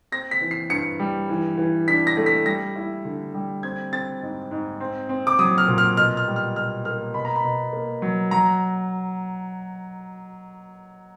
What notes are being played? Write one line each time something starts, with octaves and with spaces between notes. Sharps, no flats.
C4 A#6
B6
E3
C7
G2 C#7
G3
E3
E3
D4 B6
A#6
A3
B6
G3 A#6
E4
D3
G3
C4 G#6
C4 A6
G#2
G#2
C4
C4
D6
F#3 D#6
F6
A#2
F6
B2 F6
F6
G3
F6
B2 F6
A#3 F6
B2 B5
A#5
B5
B2
A#3
F#3
F#3 A#5